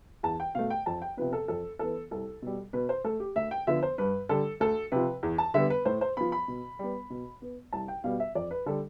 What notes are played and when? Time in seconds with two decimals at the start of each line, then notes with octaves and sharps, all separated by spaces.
0.23 E2 A5
0.40 G5
0.55 B2 A3 F5
0.70 G5
0.86 F2 A5
1.02 G5
1.17 C3 F3 B3 B4
1.33 A4
1.48 F2 A4
1.79 E3 B3 A4
2.11 C2 A4
2.42 B2 G3
2.73 B2 B4
2.89 C5
3.04 A3 A4
3.20 G4
3.36 D2 E5
3.51 G5
3.67 D3 F3 B3 E5
3.83 C5
3.98 G2 B4
4.29 D3 G3 A4
4.60 D2 A4
4.92 C3 F3 B4
5.23 E2
5.38 A5
5.54 D3 G3 B3 E5
5.70 B4
5.85 A2 C5
6.01 C5
6.17 F3 B3 B5
6.32 B5
6.48 B2
6.79 G3 B3
7.10 B2
7.42 B3
7.73 C2 A5
7.88 G5
8.04 B2 G3 B3 F5
8.20 E5
8.35 F2 D5
8.51 B4
8.66 D3 G3 A4